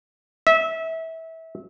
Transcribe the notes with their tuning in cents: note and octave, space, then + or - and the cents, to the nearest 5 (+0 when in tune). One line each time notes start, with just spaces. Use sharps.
E5 -25